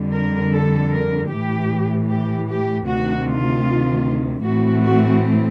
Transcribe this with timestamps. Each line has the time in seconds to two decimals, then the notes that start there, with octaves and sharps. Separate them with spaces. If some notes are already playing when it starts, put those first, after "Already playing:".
Already playing: F2 D3 G3
0.13 A#4
0.52 A4
0.91 A#4
1.30 A2 E3 A3 G4
2.09 G4
2.48 G4
2.87 D2 C3 D#3 F#4
3.27 F4
4.43 A2 E3 A3 C4 F#4
4.83 F#4